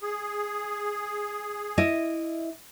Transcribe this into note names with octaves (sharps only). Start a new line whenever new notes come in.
G#4
E4 D#5